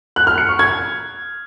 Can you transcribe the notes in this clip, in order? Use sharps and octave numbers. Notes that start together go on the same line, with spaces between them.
F#6
F6
C#7
C#6
G#6